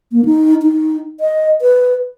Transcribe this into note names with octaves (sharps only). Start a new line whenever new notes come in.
A#3
D#4
D#4
D#5
B4